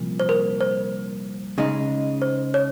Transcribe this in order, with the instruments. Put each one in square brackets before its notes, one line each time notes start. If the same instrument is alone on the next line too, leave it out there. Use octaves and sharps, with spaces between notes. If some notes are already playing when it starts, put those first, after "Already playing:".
Already playing: [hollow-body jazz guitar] C2 A#2 F3
[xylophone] C5
A#4
C5
[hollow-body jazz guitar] C#3 G#3 D#4
[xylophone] C5
C#5